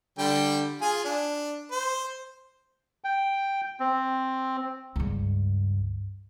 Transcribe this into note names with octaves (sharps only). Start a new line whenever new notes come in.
D3 G3 G5
F4 G#4 G#5
D4
C5
G5
C4
C#2 G2